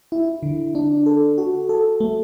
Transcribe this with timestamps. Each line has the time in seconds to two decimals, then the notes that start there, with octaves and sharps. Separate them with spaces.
0.12 E4
0.43 D3
0.75 D4
1.06 A4
1.38 F#4
1.69 A4
2.00 A3